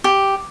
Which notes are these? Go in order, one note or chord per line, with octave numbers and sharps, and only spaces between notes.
G4